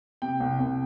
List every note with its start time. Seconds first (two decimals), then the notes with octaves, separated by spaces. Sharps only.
0.22 C3 G5
0.40 C2
0.60 C2